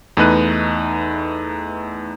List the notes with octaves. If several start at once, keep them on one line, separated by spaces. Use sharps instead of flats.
E2 A3 D#4 B4 F#6 D#7